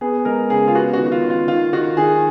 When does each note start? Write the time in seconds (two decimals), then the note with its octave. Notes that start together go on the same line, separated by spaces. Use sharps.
0.01 B3 G#4
0.25 G#3 A#4
0.50 C#3 G#4
0.68 F4
0.75 B3 F#4
0.93 F#4
0.99 D#3
1.06 F#4
1.12 F4
1.23 D#3
1.30 F4
1.48 D#3 F4
1.73 D#3 F#4
1.97 D#3 G#4